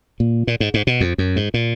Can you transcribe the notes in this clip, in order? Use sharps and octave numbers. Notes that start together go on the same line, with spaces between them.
A#2
A#2
G#2
G#2
B2
F2
F#2
G#2
A#2